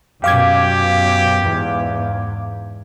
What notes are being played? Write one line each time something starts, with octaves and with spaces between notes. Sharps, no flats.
F#2 B2 G4 F5 D6 G#6
E2 G#2